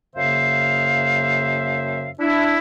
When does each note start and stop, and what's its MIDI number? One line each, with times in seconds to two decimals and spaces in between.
0.15 2.10 42
0.15 2.10 49
0.15 2.10 58
0.15 2.10 72
0.15 2.10 76
0.15 2.10 77
2.19 2.58 62
2.19 2.58 64